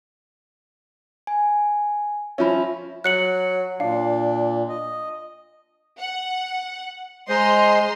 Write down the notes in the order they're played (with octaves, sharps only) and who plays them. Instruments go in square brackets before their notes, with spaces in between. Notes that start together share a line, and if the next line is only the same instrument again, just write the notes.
[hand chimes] G#5
[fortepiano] F3 C#4 [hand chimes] E5 B5
[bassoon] F#3 [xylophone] F#6 C#7 F#7
[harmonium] A#2 [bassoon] D4 [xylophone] F5
[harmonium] D#5
[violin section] F#5
[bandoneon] G#3 C5 [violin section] D#5 A#5 C6